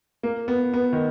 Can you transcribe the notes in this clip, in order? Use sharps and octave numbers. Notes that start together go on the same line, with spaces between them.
A#3
B3
B3
D#3